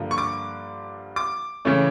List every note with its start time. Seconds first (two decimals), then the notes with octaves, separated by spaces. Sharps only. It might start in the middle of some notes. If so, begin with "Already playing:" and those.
Already playing: G2 D3 F3 A#3
0.11 C#6
0.18 D6
1.16 D6
1.65 C#3 E3 A3 C#4